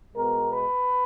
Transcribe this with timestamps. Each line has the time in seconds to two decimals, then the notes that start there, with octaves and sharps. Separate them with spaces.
0.16 B2 G#3 B3 A#4
0.51 B4